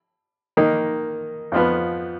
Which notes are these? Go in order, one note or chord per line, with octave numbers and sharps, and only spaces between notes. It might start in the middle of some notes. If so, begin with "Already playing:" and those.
D#3 A#3 D#4
F2 F3 B3